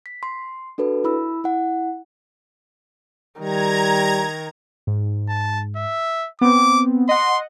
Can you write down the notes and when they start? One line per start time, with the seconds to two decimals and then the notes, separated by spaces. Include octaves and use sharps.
0.06 B6
0.23 C6
0.78 D4 F#4 A4 B4
1.04 E4 B5 E6
1.44 E4 F#5
3.41 D#3 G3 A#5 G#6
4.87 G#2
5.29 A5
5.76 E5
6.41 B3 C4 D6
7.09 D#5 F#5 C6